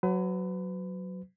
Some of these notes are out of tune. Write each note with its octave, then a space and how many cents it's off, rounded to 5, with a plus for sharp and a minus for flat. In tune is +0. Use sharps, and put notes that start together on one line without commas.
F#3 +0 B4 +35